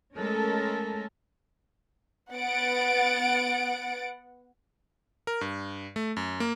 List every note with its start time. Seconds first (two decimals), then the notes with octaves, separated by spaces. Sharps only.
0.15 G#3 A3 C#4 A4 A#4
2.33 B3 F#5 A6 D7
5.27 A#4
5.41 G2
5.96 A3
6.17 F#2
6.40 A#3